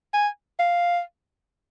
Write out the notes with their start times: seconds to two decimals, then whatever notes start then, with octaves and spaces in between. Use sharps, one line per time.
0.14 G#5
0.59 F5